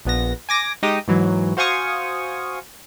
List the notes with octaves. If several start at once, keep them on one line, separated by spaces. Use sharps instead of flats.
A#1 B3 A#6
G#5 D6 A#6
G#3 D#4 G4 D#6
G#2 E3 F#3
F#4 C5 F5 G#5 C#6 D#6